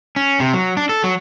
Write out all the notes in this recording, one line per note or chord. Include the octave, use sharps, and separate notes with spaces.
C#4
C3
F#3
D4
A4
F#3